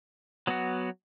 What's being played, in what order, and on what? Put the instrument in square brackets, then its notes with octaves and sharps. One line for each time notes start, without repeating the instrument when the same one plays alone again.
[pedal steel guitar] F#3 B3 F#4